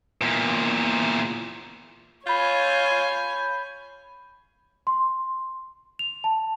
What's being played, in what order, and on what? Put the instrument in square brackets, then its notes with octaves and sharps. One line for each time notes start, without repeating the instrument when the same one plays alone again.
[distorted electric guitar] E2 A#2
[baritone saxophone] F4 [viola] C#5 G#5 [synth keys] B5 G6
[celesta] C6
F7
A5